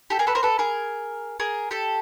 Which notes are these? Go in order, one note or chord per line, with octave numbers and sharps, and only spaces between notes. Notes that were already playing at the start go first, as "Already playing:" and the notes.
G4 A4
G#4 A#4
A4 B4
A#4 C5
A4 B4
G#4 A#4
G#4 A#4
G4 A4